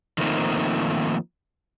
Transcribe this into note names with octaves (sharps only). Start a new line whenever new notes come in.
D#3 F3 A3 A#3 C4 D#4